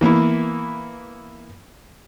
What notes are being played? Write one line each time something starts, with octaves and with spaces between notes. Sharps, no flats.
E3 A#3 B3 E4